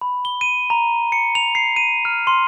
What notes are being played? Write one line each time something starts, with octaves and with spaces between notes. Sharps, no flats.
B5
G7
D#7
A#5
C#7
F7
C7
D#7
F6
C6